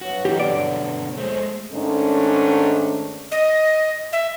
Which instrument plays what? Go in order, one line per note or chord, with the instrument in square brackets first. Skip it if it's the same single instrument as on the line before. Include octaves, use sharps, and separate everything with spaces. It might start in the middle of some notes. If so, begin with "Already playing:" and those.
[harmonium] G2 F#3 B3 [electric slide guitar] F#4
[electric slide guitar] E3 D#4 [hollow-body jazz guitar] G4
[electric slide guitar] B2 D3 [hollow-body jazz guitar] D5
[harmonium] D#2 F3 C5 [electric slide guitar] G#3 A3
[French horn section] G#2 D#3 A3 C#4 D4
[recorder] D#5
E5